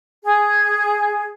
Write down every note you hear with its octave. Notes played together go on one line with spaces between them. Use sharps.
G#4